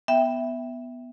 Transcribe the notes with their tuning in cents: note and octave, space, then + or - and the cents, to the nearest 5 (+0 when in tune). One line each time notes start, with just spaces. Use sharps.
B3 +0 E5 +0 G5 +0